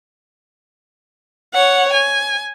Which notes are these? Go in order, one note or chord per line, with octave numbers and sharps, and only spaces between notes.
C#5 F#5
G#5